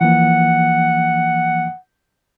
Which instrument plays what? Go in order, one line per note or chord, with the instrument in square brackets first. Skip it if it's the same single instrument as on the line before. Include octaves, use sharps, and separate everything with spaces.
[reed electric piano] E3 F3 A#3 [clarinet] F#5